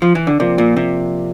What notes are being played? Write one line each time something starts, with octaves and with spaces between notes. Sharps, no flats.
F3
E3
D3
C3 F3 A#3 F4 A#4 D5
A#2
C3